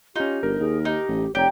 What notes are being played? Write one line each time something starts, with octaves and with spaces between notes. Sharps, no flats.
C#4 D#4 F4 G4
G1 A#4
D#2 G#4
D#4 G4
A1
F1 G4 C#5 D5 A#5